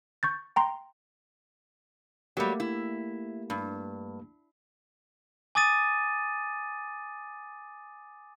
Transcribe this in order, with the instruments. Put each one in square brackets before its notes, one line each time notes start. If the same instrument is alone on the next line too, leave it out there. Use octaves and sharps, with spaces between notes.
[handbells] C#6 G6 A6
G5 A#5 C6
[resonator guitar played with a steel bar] F#3 G3 [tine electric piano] A3 A#3 G4
[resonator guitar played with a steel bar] E4
G2
[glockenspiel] G#5 D6 D#6 A6 D#7